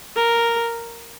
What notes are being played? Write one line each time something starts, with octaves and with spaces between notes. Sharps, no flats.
A#4